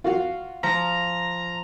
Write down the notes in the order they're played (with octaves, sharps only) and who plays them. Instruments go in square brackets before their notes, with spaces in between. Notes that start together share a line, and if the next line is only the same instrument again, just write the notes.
[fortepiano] F4 F#4 F5
[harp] F3 [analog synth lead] A#5